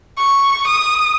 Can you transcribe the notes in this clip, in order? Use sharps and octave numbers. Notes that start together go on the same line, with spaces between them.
C#6
D#6